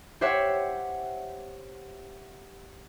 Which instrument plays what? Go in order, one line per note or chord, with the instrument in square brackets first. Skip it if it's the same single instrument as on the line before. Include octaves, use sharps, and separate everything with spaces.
[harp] G4 C5 C#5 E5 F#5